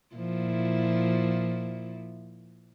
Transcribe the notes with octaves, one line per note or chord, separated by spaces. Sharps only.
A#2 F3 E4